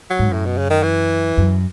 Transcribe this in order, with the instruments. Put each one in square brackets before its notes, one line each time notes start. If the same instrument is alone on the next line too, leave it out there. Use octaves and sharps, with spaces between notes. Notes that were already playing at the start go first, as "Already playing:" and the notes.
[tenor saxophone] F#3
[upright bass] G#2
[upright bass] F#2 [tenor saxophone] A2
[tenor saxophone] B2
C#3
D#3
E3
[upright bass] F#2